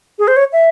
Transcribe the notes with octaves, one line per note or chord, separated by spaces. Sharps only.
G#4
C5
C#5
E5